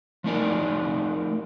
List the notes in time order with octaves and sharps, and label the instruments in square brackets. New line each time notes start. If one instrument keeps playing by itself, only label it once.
[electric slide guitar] F3 A3 D#4 A#4 D5